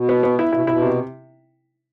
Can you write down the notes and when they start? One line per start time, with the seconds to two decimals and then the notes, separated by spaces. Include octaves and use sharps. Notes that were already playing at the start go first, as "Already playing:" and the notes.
Already playing: B2
0.09 B3
0.23 B3
0.39 E4
0.52 B2 E4
0.61 C3
0.67 B2 E4
0.82 C3